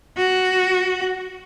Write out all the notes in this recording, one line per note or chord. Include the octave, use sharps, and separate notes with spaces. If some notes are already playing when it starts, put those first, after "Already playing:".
F#4